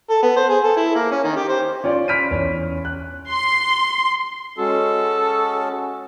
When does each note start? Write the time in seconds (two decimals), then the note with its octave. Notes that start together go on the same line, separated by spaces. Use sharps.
0.10 A4
0.23 B3
0.36 C5
0.49 G#4
0.64 A4
0.76 E4
0.95 A#3
1.11 C#4
1.24 D#3
1.36 G4
1.49 C5
1.84 C#4 F4 C#5 D5
2.08 B5 F6 B6 D7 D#7
2.31 E2 C#4
2.85 F#6
3.28 C6
4.58 G#3 C#4 F#4 A4